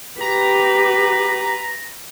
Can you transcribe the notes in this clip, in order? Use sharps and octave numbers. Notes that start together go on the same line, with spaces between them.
G4 B4 A#5